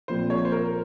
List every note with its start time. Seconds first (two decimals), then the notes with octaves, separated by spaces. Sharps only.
0.08 A#1 A#2 F3 C4 C5
0.30 C#5
0.45 C5
0.52 A#4